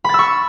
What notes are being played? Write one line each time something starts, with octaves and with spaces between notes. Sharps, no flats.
B5 C#6 E6 A6